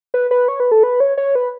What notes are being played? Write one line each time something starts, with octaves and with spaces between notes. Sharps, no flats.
B4
B4
C#5
B4
A4
B4
C#5
C#5
B4